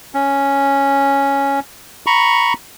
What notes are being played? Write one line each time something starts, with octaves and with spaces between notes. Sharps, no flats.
C#4
A#5 B5 C#6